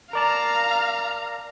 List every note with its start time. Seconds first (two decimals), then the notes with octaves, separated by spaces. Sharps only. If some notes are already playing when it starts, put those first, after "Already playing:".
0.13 A#4 D5 F5 A5 A#5